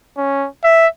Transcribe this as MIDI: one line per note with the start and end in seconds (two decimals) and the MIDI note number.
0.17 0.47 61
0.64 0.87 76